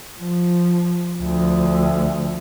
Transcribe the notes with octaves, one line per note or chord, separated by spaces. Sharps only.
F3
D2 F3